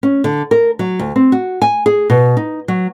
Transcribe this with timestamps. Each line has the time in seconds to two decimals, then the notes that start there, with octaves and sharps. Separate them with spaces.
0.03 C#4
0.24 D3
0.51 A#4
0.79 F#3
0.99 D2
1.16 C4
1.32 F#4
1.62 G#5
1.86 G#4
2.10 B2
2.37 D#4
2.68 F#3